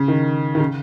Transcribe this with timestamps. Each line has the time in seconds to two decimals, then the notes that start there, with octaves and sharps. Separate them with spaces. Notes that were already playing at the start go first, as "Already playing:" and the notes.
Already playing: C#3
0.08 D#3
0.55 D#3
0.59 C#3